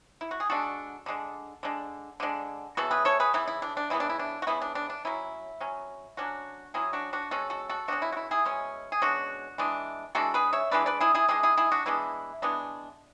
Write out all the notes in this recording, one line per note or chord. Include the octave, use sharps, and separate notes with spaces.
E4
F#4
G#4
D3 G#3 D4 F#4 A4
D3 G#3 D4
D3 G#3 D4
D3 G#3 D4
C#3 E3 B3 F#4 A4
G#4 B4
A4 C#5
G#4 B4
C#3 E3 B3 E4
E4
D4
D4
C#3 E3 B3 E4
D4
E4
D4
F#4
C#3 E3 B3 E4
D4
D4
D4
F#3 C#4 E4
F#3 C#4
F#3 C#4 D4 F#4
F#3 C#4 E4 G#4
D4 F#4
D4 F#4
B2 G#3 C#4 F#4 A4
F#4 A4
F#4 A4
B2 G#3 C#4 D4 F#4
E4
F#4
E4
E4 G#4
B2 G#3 C#4
G#4
B2 G#3 C#4 D4 F#4
E3 G#3 D4
E3 G#3 D4 F#4 A4
G#4 B4
C#5 E5
E3 G#3 D4 B4 D5
B4 D5
E4 G#4
E4 G#4
E3 G#3 D4 E4 G#4
E4 G#4
E4 G#4
D4 F#4
E3 G#3 B3 D4 E4
E3 G#3 B3 D4